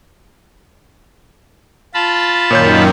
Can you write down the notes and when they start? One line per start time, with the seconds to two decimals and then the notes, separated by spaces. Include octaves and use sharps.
1.94 F4 A5 B5
2.51 F#2 A#2 D#3 C#5 G6